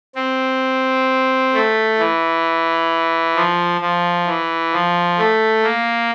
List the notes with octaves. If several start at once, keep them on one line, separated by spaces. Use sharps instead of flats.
C4
A3
E3
F3
F3
E3
F3
A3
A#3